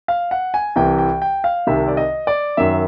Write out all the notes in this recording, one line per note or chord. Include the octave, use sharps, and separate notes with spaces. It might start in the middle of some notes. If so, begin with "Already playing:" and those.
F5
F#5
G#5
C2 C3 E3 G5
G5
G5
F5
C2 C3 D#3 E5
D5
D#5
D5
F#2 D#3 E5